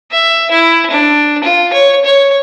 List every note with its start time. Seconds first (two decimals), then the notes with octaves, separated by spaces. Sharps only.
0.11 E5
0.51 E4
0.91 D4
1.44 F4
1.73 C#5
2.05 C#5